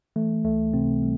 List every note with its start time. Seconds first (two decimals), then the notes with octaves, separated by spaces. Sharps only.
0.16 E3 A3
0.44 C#2 A3
0.74 C3 C4
1.02 G3